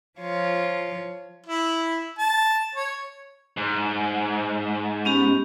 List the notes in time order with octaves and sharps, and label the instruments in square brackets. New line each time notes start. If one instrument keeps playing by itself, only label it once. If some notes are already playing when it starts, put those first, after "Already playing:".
[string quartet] F3 F4 C#5
[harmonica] E4
A5
C#5
[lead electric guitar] G#2
[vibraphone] B3 C#4 G4